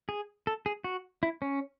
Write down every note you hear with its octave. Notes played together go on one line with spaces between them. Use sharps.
G#4
A4
G#4
F#4
E4
C#4